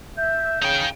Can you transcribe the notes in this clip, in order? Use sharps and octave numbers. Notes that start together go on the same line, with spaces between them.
E5 G6
C#3 D#4 G5